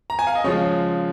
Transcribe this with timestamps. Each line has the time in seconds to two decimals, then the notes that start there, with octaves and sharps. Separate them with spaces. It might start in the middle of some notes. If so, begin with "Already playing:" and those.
0.10 A#5
0.19 G#5
0.27 F5
0.35 D#5
0.44 C#3 F3 G#3 C#5